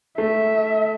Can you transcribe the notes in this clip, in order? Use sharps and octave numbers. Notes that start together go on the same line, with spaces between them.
A3 E5